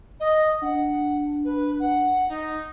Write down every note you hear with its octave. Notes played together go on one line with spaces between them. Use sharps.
D#5
D4 F#5
B4
F#5
D#4